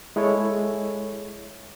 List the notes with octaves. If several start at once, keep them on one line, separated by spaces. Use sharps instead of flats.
G#3 E4 A4 C#5